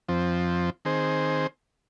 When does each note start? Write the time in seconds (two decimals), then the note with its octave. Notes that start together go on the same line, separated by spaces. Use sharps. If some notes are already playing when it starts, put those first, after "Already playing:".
0.08 F2 F3 C4
0.85 D#3 C4 G#4 C5